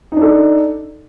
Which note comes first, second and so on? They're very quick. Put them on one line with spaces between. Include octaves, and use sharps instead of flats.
D#4 D4 A4